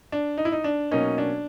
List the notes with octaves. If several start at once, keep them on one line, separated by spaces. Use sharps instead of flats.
D4
D#4
E4
D#4
D4
B2 F#3 A#3 C#4 D#4
D4